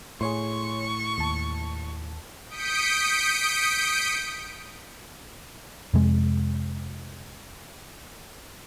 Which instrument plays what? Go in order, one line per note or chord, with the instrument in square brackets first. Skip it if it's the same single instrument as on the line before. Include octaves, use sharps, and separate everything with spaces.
[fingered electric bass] A2 [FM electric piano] G#4 C#5 C6 [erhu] C#6
[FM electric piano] D#2 A5
[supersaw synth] D#6 G6 B6 C#7 D7
[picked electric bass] F2 C3 G#3